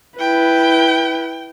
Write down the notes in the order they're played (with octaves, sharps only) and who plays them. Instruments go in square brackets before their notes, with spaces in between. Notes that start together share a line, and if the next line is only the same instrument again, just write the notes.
[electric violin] E4 B4 [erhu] G5